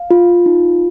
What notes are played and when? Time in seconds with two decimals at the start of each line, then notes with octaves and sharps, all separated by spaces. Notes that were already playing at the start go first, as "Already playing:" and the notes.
Already playing: F5
0.11 F4
0.46 D#4